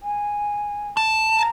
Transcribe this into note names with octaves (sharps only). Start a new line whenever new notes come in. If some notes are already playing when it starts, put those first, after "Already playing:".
G#5
A5
A#5